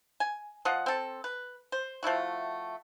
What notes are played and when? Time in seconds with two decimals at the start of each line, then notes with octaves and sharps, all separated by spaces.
0.20 G#5
0.65 F3 D#5 F5 F#5
0.86 C4 A4
1.24 B4
1.72 C5
2.03 F3 A3 E4 F#4